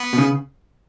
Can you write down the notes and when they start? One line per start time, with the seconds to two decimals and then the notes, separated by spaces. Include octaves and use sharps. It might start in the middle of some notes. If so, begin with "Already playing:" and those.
Already playing: B3
0.13 B2
0.18 C#3